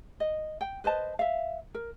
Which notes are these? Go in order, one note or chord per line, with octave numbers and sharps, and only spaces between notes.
D#5
G5
B4 C5 D#5 A5
E5 F5
A#4